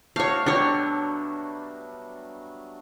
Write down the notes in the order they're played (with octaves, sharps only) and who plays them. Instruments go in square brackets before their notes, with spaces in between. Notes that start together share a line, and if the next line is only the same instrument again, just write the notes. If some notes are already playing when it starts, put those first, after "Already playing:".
[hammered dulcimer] A3 D4 F#4 [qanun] C#5 F5
[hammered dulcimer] B2 F#3 G3 [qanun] D4 C#5